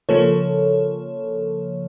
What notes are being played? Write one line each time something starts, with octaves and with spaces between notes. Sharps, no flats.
C#3 F3 A#3 A4 C#5